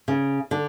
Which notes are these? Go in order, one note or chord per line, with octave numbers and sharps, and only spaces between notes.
C#3
D3